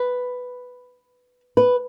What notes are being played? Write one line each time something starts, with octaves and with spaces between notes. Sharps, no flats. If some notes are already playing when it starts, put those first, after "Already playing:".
Already playing: B4
B4